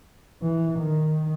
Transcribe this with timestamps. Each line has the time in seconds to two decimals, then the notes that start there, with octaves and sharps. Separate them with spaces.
0.42 E3
0.79 D#3